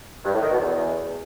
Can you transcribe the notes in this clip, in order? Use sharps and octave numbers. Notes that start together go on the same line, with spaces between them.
G2
A2
D#3
B2
E2